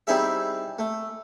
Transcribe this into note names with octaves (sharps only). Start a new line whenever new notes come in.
G3 C4 D#4 E4 G#4 E5
A3